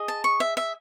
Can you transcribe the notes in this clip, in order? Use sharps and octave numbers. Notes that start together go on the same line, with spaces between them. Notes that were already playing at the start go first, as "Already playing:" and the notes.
Already playing: G#4 D#5
A5
C#6
E5
E5